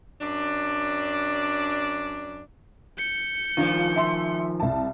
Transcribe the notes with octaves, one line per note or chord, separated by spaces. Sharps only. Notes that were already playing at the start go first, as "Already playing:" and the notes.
F#2 D4
G6 C#7
D#3 F3 D4 F4
E5 C6
C2 A5